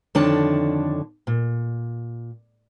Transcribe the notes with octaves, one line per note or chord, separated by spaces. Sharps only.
F2 D3 D#3 D4 C#5 A5
A#2